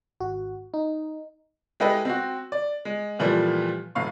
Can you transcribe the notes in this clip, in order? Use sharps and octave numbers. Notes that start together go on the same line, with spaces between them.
G#1 F#4
D#4
G#3 E4 G4 A4 B4 D#5
C4 F#4
D5
G#3
A#2 E3 F3 G3 A3
E1 A2 F5 C#6